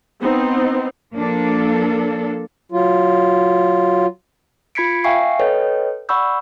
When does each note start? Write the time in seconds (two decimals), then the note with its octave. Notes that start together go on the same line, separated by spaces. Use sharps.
0.21 B3 C4 D#4
1.15 F3 A#3 D4 A4
2.72 F#3 F4
4.75 F4 B5 G#6 B6 C#7 D7
5.04 E5 F5 G5 G#5 C#6 C7
5.39 A4 B4 C#5 D#5 G5
6.09 D5 F#5 B5 C#6 E6 G6